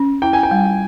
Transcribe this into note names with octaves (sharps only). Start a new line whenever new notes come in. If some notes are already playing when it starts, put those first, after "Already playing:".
Already playing: C#4
E4 G5
G#5
G5
G3